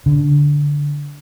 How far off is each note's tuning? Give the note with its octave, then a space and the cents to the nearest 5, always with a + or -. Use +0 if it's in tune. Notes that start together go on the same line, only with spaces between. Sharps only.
D3 -10